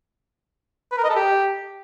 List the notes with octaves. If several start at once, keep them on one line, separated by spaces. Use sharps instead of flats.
B4
A#4
D#5
A4
G4